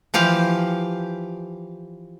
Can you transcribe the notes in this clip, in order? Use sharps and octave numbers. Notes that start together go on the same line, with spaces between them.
E3 F3 G4 F5